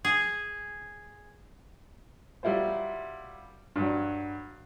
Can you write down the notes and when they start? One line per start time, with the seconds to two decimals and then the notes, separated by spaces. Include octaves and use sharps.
0.05 G#4
2.43 F#3 G3 E4 F4 C5
3.76 G2 F#3